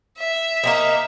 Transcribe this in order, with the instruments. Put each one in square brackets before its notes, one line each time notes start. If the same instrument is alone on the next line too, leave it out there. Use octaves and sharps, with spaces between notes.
[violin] E5
[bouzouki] A#3 C4 D#4